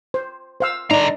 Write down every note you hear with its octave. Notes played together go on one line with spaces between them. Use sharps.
C5
C5 F5 E6
D3 D4 D#4 A#5